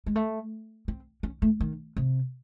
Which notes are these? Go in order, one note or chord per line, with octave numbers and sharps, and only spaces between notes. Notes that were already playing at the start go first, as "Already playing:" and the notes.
G#3
A3
C4
C#4
A3
D#3
C3